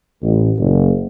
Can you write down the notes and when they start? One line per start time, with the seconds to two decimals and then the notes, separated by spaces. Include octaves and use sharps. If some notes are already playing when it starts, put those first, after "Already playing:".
0.22 A1
0.59 F#1